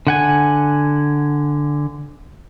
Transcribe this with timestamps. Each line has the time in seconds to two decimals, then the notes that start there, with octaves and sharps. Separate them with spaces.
0.07 D3 F#5 G#5